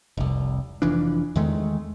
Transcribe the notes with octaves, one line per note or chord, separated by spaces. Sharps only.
F1 C2
F1 E3 F3 D4
E2 D#3 G#3 A3